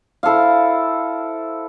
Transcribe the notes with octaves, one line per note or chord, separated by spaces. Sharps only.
E4 A4 C5 F5